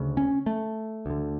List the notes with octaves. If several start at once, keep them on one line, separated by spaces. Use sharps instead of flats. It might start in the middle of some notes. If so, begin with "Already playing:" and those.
Already playing: D2 C#3
C#4
A3
D2 D3